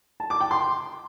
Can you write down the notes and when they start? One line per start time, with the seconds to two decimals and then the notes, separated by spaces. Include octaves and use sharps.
0.20 A5
0.30 D6
0.41 G5
0.51 C6